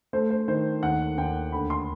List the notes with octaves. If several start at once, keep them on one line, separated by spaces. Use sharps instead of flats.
A3 C5
C5
D#3 C5
D#2 F#5
D#2 G5
D2 B5
C6